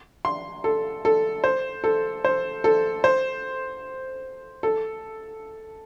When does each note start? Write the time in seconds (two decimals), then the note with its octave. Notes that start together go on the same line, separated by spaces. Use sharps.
0.25 C6
0.64 A4
1.05 A4
1.44 C5
1.84 A4
2.25 C5
2.64 A4
3.04 C5
4.63 A4